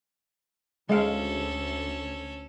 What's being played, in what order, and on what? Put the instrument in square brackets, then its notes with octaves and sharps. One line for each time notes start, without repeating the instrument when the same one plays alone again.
[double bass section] D2 [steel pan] G#3 F5 [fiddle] C#4 A4